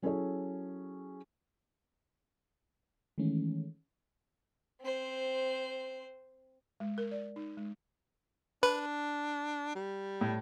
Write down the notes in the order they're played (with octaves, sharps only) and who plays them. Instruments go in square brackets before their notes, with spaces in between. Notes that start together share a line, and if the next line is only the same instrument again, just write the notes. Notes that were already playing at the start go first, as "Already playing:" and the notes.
[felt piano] F#3 C#4 E4 G#4 A4 C#5
[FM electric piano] D#3 E3 G#3 A3 C#4
[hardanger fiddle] C4 C5
[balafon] G#3
A#4
D5
D#4
G#3
[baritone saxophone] D4 [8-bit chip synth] B4
[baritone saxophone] G3
[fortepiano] A2